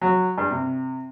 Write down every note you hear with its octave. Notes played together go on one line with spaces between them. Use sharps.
F#3
G2
C3